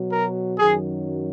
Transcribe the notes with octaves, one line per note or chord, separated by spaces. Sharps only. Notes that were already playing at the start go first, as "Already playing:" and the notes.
Already playing: B2 F#3
A#4
F#2 D#3 F#3 G#4